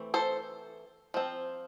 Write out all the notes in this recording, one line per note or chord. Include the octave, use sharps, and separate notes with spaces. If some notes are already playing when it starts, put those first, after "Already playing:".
Already playing: E3 A3 C4
A4 C5
F3 C4